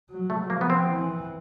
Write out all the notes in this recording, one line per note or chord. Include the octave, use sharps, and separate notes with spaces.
F#3
A3
F3 A#3
B3
C4
E3